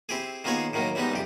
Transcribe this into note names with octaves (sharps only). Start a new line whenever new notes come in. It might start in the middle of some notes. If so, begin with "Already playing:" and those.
C4 E4 G4 G#4
D#3 A#3 B3 F4 G#4 C#5
A2 D#3 F#3 A#3
E3 G3 G#3 B3 D#4
C2 F2 G4